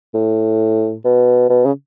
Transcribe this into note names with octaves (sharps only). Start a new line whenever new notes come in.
A2
B2
B2
C#3